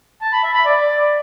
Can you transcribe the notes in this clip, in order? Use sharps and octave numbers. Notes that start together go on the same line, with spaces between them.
A5
B5
E5
B5
D5